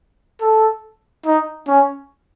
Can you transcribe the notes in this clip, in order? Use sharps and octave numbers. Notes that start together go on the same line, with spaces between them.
A4
D#4
C#4